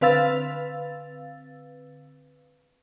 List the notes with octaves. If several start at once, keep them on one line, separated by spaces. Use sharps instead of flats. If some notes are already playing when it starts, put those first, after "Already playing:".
D3 C4 B4 F5 E6 A6